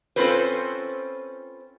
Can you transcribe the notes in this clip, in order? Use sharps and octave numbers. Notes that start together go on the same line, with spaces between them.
C4 C#4 F4 A4 B4 C5